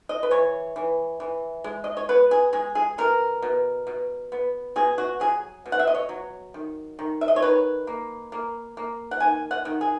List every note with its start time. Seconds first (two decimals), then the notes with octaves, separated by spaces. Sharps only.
0.09 D#5
0.23 B4
0.31 E3 C#5
0.76 E3
1.20 E3
1.64 G#3
1.84 D#5
1.97 C#5
2.09 B3 B4
2.31 G#4
2.53 G#3 G#4
2.75 G#4
2.98 B2 A#4
3.42 B2
3.87 B2
4.32 B3
4.76 B2 G#4
4.98 F#4
5.20 F#3 G#4
5.66 B2
5.72 F#5
5.79 E5
5.87 D#5
5.95 C#5
6.09 F#3
6.54 D#3
6.99 D#3
7.21 E5
7.28 D#5
7.36 C#5
7.42 D#3 B4
7.87 A#3
8.32 A#3
8.77 A#3
9.11 F#5
9.20 D#3 G#5
9.51 F#5
9.65 D#3
9.81 G#4